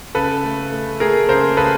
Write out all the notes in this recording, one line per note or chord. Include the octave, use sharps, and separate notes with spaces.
C#3 A4 B4
A3
A3
A3 G#4 A#4
C#3 A#4 C5
C#3 A4 B4